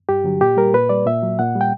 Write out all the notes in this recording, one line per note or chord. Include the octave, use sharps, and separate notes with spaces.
G2 G4
D3 F#3
A#2 G4
G3 A#4
A#2 B4
G3 D5
A#2 E5
F#3
A#2 F#5
G3
G5